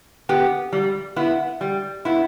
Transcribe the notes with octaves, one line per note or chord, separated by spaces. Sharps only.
B3 G4
G3
B3 E4
G3
B3 E4